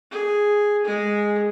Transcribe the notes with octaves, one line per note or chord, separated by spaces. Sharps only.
G#4
G#3 G#4